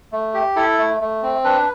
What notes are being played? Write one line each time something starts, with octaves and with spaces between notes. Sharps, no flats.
A3
G4
E4 A4
A3
A3
C4
D4 B4